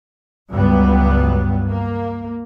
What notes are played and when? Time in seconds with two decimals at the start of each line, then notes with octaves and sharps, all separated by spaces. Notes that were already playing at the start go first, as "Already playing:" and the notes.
0.50 C#2 G2 F#3 G3 B3
1.68 A#3